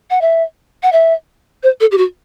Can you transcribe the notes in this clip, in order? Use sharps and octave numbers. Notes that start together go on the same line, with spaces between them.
F#5
E5
F#5
E5
C5
A4
G4
F#4